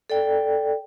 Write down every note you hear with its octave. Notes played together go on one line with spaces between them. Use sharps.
A4 D5 G5